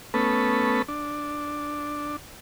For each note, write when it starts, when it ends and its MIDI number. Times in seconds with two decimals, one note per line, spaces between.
0.14 0.82 57
0.14 0.82 59
0.14 0.82 61
0.14 0.82 69
0.14 0.82 71
0.88 2.16 62